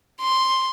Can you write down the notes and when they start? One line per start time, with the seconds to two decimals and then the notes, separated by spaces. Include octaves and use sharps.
0.21 C6